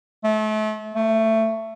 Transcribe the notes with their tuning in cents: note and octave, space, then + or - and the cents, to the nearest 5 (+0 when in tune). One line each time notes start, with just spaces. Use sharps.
A3 -35
A3 +15